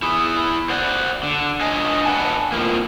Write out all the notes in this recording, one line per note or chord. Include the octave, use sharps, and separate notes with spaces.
E4 G#4
C5 D5 F#5
D3
D4 C#5 D#5 G#5
B4 D5 F#5 G#5 A5
F2 A2 C3 F3 A#3